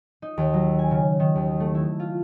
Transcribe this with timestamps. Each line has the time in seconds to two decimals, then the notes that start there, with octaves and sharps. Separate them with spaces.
0.22 D#4
0.38 D#2
0.54 F#3
0.79 G#5
0.91 C#3
1.20 D#3
1.35 D#2
1.60 A3
1.75 E4
2.00 F4